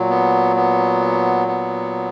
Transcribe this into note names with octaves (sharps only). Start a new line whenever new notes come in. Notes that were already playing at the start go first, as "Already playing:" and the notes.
Already playing: A#2 F#3
B3
B3
B3